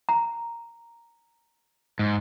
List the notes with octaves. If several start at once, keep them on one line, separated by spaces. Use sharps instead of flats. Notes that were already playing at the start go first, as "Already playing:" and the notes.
A#5
G#2